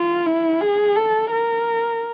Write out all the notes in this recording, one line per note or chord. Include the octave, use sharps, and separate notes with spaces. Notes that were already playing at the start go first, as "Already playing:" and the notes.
Already playing: F4
E4
G#4
A4
A#4